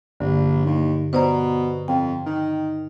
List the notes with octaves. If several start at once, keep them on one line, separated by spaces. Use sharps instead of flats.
A#1 G2 D3
D#2
B2 C5 D5 A#5
F2 G5
D#3